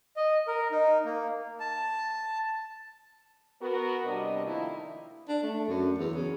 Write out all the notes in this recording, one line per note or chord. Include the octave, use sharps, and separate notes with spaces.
D#5
A#4
D#4
A#3
A5
B3 F#4 A#4
C3 G3 D4 D#5
D#3 F3 A3 A#3 D#4 E4
D4
A3
F#2
E2
C#3